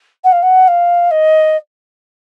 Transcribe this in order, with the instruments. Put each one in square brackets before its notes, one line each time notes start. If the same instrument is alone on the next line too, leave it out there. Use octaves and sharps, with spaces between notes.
[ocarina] F#5
F5
F#5
F5
D#5